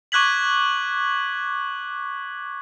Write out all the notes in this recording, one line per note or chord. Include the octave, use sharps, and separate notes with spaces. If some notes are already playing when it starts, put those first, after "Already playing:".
C#6 D6 F#6 G#6 B6 F#7